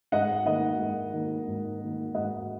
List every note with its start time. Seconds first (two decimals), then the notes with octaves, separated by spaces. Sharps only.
0.12 G#2 D#5 F#5
0.45 D#3 A#3 D#5 F#5
0.79 G#2
1.14 D#3 A#3
1.47 G#2
1.81 D#3 A#3
2.15 G#2 D#5 F#5